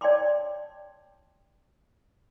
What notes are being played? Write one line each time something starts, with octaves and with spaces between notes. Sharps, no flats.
C#5 D5 G5 A5 C6 D6